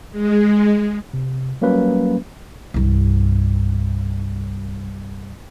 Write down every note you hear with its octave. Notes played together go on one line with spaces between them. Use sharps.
G#3
C3
F#3 G3 A#3 C#4 B4
C2 G2